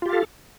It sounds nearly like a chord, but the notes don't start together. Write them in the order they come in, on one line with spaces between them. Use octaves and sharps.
F4 G4 F5 A4